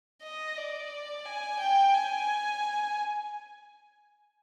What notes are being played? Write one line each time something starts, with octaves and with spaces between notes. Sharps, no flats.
D#5
D5
G#5
G5
G#5